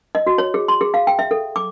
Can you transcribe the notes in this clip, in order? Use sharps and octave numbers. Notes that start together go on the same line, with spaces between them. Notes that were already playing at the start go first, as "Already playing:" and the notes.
D#5
F#4
C#5
G#4
C6
G#4
F5
G5
E5
A4
D6